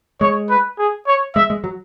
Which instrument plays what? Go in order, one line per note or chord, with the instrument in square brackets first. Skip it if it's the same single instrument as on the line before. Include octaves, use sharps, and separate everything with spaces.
[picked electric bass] G#3 [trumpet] C#5
[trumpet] B4
G#4
C#5
[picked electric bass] G#3 [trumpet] E5
[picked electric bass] G#3
F#3